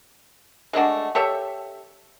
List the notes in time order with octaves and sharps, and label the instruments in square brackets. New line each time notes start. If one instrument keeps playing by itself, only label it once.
[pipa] G#3 A3 D4 F#4
G4 A4 C#5 E5